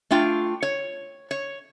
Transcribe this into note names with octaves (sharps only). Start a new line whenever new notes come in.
A3 D4 F4 G5
C#5
C#5